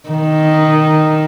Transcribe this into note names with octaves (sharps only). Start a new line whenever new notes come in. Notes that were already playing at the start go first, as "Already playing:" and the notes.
D#3